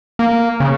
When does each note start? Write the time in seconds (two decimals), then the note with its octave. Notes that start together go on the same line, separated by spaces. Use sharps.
0.19 A#3
0.60 C#3